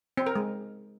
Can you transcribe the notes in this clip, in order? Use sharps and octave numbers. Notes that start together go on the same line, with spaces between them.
C4
A#4
G#3